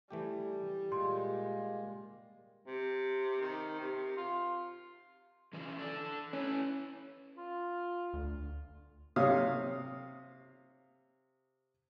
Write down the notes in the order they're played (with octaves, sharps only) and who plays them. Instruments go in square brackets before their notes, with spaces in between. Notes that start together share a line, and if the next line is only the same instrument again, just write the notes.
[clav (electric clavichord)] E3 A3 G4 [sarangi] G3
[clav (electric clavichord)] A#2 [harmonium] G#3 A#3 [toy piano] C6
[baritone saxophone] C3
D#3
C3
F4
[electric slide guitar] E3 C#4 F4
D4 A4 D5
[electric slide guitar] A3 E4 B4 [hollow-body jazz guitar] C#4
[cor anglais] F4
[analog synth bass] D2
[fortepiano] C3 C#5 F5 D#6